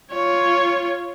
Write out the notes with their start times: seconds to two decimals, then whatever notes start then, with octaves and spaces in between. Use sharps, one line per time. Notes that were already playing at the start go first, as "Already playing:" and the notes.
0.12 F4 C#5